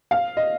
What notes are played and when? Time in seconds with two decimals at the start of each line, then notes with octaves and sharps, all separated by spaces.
0.11 F5
0.37 D#5